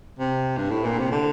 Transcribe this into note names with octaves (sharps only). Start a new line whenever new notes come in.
C3
G2
A2
A#2
C3
D3